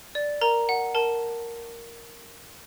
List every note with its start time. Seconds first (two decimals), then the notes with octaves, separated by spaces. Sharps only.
0.15 D5
0.41 A#4 A#5
0.69 F#5
0.95 A#4 A5